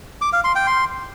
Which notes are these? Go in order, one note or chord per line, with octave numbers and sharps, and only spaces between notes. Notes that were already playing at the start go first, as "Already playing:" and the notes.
D6
F5
C6
G5
C6